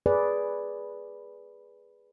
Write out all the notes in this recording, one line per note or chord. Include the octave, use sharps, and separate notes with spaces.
G#4 B4 D5